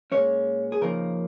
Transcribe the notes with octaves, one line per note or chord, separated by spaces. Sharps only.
A#2 G#3 C#4 C#5
G#4
C#3 F3 A#3 D#4 A#4